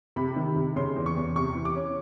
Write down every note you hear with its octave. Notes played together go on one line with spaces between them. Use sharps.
C3 B5
D#3
C3
C#3 C6
E2
C#6
E2
C3 C#6
E3
D6
C#4